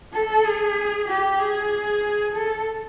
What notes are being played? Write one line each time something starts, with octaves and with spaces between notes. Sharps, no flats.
A4
G#4
G4
G#4
A4